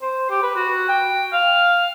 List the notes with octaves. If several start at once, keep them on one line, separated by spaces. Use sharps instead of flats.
C5
G4
B4
F#4
G5
F5